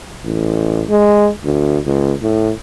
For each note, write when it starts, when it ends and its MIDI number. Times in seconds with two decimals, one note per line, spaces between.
0.25 0.84 33
0.90 1.29 56
1.44 1.78 38
1.86 2.13 37
2.23 2.51 45